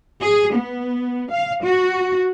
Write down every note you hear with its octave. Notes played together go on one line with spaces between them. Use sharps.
G#4
B3
F5
F#4